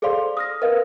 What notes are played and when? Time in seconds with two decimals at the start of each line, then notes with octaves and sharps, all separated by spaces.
0.02 G#4 A4 C5 D5 F5 C6
0.37 D#6 F6 A#6
0.62 A#4 B4 D#5 F5